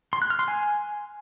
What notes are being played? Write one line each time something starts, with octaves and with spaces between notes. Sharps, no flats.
C6
F#6
F6
C6
G#5